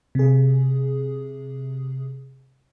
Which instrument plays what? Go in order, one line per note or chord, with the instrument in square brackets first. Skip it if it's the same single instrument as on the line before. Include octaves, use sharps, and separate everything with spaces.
[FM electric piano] C3 G#4